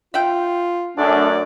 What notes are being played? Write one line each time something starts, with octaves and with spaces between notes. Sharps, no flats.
F4 E5 F#5 G5
F#2 A3 D4 D5